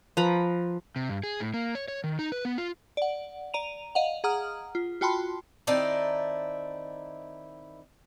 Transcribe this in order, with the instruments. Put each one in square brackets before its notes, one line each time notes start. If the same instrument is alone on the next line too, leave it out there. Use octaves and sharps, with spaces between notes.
[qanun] F3 B4 A#5 B5
[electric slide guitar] C3
G2
G#4
A2
A#3
C#5
C#5
D#3
D#4
B4
B3
F4
[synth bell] D5 F#5
D5 A#5 D#7 F7
D#5 F5 F#5
G#4 F#5 A#5 D#6 F6
F4
F4 F#4 G5 A5 B5 C6
[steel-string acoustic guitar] D#3 C4 D#4 E4 D5 A5